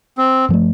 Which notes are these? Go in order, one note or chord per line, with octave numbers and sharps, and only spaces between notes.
C4
G2 F3 A3